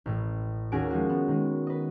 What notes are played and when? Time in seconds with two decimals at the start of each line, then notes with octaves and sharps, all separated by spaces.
0.06 A1 A2
0.72 D#2 C#4 F#4 G#4 G#5 D7
0.90 F3 G#3 F#4
1.09 B3
1.28 D#3 G#3
1.67 B4 D#5